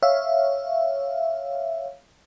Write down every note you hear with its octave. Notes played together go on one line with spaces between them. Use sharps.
C#5 E5 F5